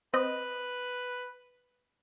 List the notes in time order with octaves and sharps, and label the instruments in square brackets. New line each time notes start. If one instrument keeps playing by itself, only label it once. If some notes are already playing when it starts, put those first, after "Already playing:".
[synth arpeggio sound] C4 D#5 [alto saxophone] B4